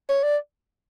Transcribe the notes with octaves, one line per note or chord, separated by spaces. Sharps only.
C#5
D5